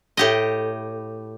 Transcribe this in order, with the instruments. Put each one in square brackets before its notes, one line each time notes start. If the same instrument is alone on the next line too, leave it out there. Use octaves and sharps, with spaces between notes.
[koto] A2 G4 D#5